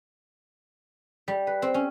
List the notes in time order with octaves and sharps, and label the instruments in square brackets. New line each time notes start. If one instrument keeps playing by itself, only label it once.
[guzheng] G3
B4
C4
C#4